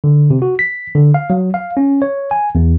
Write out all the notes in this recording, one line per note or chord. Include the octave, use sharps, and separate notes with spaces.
D3
C3
F#4
B6
D3
F5
F#3
F5
C#4
C#5
G#5
E2